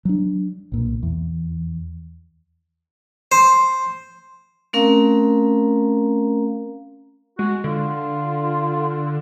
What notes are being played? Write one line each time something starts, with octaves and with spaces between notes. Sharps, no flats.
F#3 D4
B1 A#2
E2
C5
A3 C4 C#4 A#4 F5 A#5
G#3 F#4
D3 F4